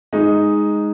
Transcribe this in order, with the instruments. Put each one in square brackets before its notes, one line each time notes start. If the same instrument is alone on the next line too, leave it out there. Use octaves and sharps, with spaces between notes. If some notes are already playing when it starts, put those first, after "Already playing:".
[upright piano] G#3 D#4